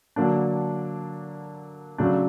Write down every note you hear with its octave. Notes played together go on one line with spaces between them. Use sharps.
D3 F#3 A#3 D4
C#3 F#3 A3 D4